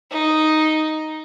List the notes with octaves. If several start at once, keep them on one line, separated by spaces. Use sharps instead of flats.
D#4